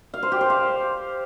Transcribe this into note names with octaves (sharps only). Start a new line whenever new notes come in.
F5
C5
G4
C5
F5